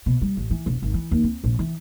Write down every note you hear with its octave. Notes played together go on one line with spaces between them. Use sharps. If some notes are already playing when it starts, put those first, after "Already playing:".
B2
G3
A1
E3
E1
G#1
E3
D#2
C4
A#1
E3